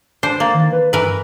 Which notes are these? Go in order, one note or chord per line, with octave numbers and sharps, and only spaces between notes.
D4 C5
A#3 A6
D#3
B4
G2 E3 A#4 B4